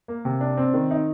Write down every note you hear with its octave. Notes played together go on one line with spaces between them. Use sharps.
A#3
C3
D4
C4
D#3
D#4